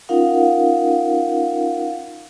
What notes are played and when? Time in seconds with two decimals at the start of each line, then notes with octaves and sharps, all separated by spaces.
0.09 C#4 D#4 F4 A#4 F5 F#5